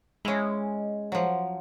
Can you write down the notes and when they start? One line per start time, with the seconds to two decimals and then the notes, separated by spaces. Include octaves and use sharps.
0.25 G#3 C#4 E4
1.12 F3 F#3